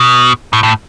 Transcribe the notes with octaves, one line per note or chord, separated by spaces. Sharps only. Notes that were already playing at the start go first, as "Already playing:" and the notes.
Already playing: B2
A2
A2